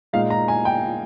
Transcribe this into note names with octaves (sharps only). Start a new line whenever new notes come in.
A#2 G#3 D#4 F5
A#5
G#5
G5